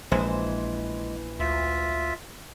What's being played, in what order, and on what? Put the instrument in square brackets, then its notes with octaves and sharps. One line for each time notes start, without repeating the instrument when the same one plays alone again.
[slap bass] A#1 [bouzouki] E3 C5 [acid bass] G#3
[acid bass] D2 [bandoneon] F4 E5